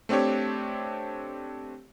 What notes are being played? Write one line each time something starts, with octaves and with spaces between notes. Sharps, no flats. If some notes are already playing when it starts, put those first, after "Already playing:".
A3 C4 D4 G4 C#5